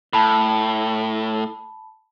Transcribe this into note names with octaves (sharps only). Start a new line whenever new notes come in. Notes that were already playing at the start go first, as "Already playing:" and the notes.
A2 A5 B5